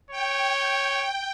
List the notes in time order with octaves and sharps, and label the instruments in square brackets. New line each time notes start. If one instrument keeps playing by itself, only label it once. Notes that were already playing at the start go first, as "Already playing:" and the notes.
[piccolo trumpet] C#5 [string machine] G5